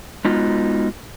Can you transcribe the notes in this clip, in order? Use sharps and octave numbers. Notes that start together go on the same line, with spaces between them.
G#3 B3 D#4 F4 F#4